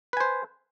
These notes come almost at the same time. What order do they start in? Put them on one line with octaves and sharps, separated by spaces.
B4 G#5 C5